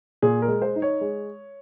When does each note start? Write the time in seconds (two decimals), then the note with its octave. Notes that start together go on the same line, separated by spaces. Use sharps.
0.22 A#2 G#4
0.42 A#4
0.48 G#3
0.62 C5
0.76 D#4
0.82 C#5
1.01 G#3